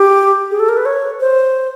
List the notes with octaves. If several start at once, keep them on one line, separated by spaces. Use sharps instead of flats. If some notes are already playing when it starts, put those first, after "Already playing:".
Already playing: G4
G#4
A4
A#4
B4
C#5
C5